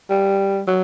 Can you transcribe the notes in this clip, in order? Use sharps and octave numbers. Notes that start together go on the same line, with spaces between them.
G3
F#3